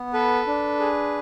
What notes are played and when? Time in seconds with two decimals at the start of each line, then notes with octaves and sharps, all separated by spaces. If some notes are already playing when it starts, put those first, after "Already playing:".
Already playing: B3
0.13 A4 B4
0.47 D4
0.80 G#4